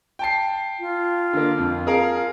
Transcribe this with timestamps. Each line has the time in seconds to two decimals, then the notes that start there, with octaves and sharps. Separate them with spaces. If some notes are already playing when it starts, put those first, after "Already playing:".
0.19 G5 A5 C7
0.80 F4
1.33 D3 A#3
1.58 F2
1.87 G#4 A#4 F5